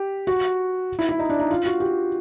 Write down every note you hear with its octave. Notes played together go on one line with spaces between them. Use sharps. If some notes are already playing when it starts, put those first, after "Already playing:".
Already playing: G4
F#4
E4
E4
D#4
D4
D#4
F4
F#4
G4